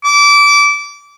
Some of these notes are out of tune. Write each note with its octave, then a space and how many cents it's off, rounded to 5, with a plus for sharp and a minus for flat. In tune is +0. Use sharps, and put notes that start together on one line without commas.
D6 -25